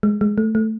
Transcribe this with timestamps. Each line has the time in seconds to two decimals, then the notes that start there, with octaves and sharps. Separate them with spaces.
0.03 G#3
0.21 G#3
0.38 A3
0.55 A3